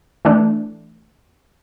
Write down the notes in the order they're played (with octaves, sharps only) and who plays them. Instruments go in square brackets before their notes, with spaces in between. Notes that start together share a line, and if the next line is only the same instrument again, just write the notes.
[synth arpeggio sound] E3 A3 D4